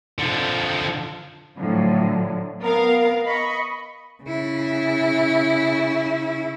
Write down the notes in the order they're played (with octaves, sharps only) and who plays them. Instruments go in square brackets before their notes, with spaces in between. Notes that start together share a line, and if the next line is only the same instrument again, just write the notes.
[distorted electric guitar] D3 F3
[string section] A2 D3 F3 F#3
B3 A#4 F5
D#5 B5 C#6
[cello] C#3 E4